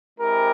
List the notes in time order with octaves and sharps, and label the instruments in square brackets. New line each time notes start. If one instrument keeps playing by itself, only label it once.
[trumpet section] G#3 C4 E4 G4 A#4